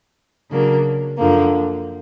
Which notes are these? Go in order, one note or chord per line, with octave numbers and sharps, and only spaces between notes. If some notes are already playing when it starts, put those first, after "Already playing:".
C#3 F#3 A#3 D4
F#2 D3 F3 A#3